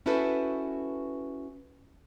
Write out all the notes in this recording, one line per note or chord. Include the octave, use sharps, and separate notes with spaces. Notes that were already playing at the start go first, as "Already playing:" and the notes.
C#4 E4 F#4 A4 B4 C5